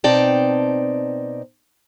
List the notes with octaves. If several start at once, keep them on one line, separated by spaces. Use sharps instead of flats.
B2 C4 D#4 D5 G5 A5